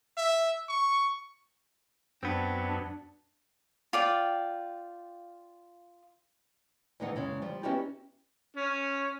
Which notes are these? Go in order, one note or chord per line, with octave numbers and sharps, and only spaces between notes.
E5
C#6
F#2 B3 C4 D4
F4 D5 G5
D2 A2 E3 G#3 D#4 F#5
F#2 C#3 G#3
F3 G3
B3 C#4 D#4 E4 F#4 G4
C#4